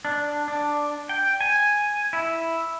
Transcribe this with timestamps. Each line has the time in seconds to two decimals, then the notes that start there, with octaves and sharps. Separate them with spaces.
0.05 D4
0.48 D4
1.09 G5
1.41 G#5
2.13 E4